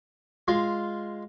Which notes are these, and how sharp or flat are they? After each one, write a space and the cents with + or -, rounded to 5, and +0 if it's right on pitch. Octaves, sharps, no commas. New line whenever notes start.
G#3 +0 F4 +0